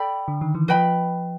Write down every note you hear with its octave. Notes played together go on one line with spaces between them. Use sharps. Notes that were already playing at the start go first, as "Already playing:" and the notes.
Already playing: A4 D5 G5 B5
D3
D#3
E3
F3 B4 D#5 G5 B5